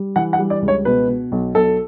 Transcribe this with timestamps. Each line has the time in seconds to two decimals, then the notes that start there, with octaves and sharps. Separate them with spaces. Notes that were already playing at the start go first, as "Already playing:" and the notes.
Already playing: G3
0.16 E3 F#5
0.33 F#5
0.39 G3
0.50 D5
0.62 C#2
0.68 C#5
0.85 B2 B4
1.09 B2
1.32 B1
1.55 B1 A4